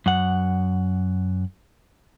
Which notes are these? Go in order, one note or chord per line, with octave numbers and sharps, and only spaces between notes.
F#2 F#5